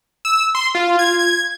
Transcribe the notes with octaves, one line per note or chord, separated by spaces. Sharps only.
E6
C6
F4
G#6
G#6